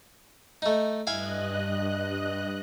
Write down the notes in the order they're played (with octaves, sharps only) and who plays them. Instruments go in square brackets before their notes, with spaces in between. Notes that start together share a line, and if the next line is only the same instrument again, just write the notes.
[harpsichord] A3 D#4
[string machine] G2 D#5 F#6 [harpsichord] E4 F5 G#5